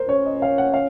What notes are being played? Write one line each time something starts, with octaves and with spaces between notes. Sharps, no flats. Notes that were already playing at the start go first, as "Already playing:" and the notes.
Already playing: A#4 C5
C#4 C#5
D#5
F5
F#5
F5